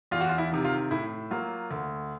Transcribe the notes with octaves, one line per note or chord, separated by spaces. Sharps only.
E2 F4
F#4
F4
E4
C3 D#3
F4
A2 E4
F#3 A#3 F4
D2